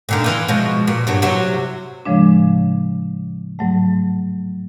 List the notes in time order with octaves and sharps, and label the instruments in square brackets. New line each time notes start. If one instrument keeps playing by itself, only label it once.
[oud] A#2 D3 D#3
E3 F4
B2 F3 G#3
A#2
G2 F#3 D4
C3 F#3 E4
[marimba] A2 C#3 F3 G#3 D4
G#2 F#3 A3